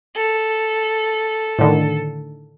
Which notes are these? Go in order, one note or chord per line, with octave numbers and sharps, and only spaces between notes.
A4
A2 D3 D#3